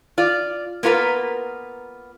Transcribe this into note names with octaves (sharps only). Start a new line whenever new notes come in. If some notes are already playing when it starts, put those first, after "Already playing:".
F4 D5
A#3 B3 F4 A#4 B4